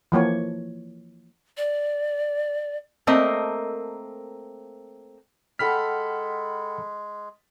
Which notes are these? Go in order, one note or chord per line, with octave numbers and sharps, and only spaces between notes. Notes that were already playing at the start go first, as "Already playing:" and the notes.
E3 F3 A#3 C#5
D5
A3 A#3 C4 A#4 D#5
G#3 A4 F#5 G5 B5 F6 B6